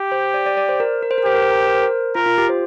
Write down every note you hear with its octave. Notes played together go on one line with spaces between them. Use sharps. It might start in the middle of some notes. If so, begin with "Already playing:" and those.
Already playing: G4
C5
D5
D5
D5
C5
A#4
A#4
C5
A#4
G4 C5
A#4
C5
A#4
C5
A#4
C5
A#4
F4 A#4
F4
G4
C5